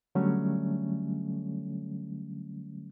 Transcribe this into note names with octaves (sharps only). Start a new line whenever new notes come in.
D3 F#3 G3 A3 C#4